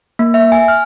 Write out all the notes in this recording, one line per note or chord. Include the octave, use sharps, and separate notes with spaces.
A#3
E5
G#5
F6